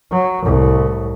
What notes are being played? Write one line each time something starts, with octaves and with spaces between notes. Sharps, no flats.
F#3
C2 A2